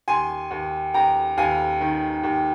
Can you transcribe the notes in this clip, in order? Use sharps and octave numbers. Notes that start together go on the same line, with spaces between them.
D#2 G#5 C6
D#2
D#2 G5 A#5
D#2 F5 G#5
D#3
D#2